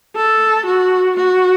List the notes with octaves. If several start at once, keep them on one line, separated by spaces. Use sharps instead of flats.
A4
F#4
F#4